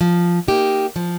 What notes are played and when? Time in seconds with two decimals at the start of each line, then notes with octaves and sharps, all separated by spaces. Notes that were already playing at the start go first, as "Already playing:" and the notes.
0.01 F3
0.48 A#3 D#4 G4
0.96 F3